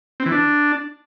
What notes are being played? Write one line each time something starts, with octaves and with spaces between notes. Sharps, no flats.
C4
E3
D4